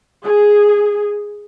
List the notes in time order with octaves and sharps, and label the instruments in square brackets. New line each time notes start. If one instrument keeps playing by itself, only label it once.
[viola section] G#4